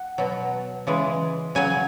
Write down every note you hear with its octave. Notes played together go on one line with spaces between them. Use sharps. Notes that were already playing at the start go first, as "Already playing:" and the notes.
Already playing: F#5
B2 F#3
C#3 E3 G#3
C#3 F#3 G#5